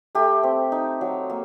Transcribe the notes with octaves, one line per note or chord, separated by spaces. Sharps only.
A3 G4
C4
D#4
F#3
A#3